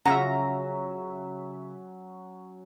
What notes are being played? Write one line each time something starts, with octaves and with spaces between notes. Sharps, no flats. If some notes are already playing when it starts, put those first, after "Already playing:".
C#3 F#3 C#4 F4 F#4 E5 F#5 A#5